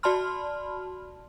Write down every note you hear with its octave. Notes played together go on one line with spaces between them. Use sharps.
F#4 D5 A5 B5 C6 F6